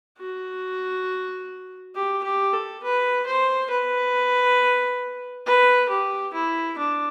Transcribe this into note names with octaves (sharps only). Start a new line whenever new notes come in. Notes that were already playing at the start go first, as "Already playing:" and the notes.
F#4
G4
G4
A4
B4
C5
B4
B4
G4
E4
D4